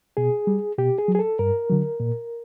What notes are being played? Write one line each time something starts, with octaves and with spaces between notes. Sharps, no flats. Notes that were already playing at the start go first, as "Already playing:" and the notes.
B2 G#4
G3
B2 G4
G#4
F#3
G#4
A4
G2 A#4
D3 F#3
A#2